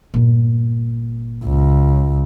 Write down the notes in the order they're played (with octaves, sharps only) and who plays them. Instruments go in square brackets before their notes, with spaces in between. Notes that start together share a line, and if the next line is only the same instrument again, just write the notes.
[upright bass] G1 A#2
[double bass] C#2